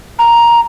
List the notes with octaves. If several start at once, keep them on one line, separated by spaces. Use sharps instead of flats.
A#5